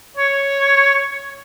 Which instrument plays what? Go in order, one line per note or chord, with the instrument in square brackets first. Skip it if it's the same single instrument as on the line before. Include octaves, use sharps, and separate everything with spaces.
[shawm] C#5